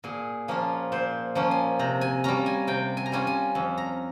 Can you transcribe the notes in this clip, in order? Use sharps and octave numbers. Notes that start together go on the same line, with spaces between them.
A#2 G#4
F3 A#3 C#4 F4
A#2 C5
F3 A#3 C#4 F4
G#5
C3 A#5
G#5
G3 C#4 F4 A#5
G#5
C3 G5
G#5
A#5
G3 C#4 F4 G#5
G#5
F2
A#5